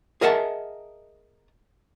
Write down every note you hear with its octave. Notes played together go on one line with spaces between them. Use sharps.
G#4 A#4 D#5 E5 F#5 A5